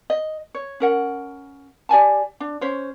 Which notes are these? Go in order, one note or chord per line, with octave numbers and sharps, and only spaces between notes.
D#5
C#5
C#4 A#4 F#5
G4 D5 G#5 A5
D4
C#4 C5 C#5